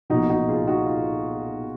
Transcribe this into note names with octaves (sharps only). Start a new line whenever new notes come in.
B1 A#2 F3 D#4 F#4
D#4 F#4
F4 G#4
D#4 F#4
F4